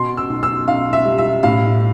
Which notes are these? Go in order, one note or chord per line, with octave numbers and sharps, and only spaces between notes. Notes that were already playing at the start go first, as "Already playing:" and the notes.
Already playing: B2 C6
E6
B1
E6
B1 F5
E5
G3
E5
A2 F5